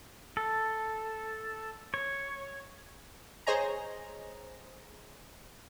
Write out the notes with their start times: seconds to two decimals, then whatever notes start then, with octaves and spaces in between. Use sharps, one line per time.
0.37 A4
1.94 C#5
3.47 G#4 C5 C#5 D#5 G#5 A#5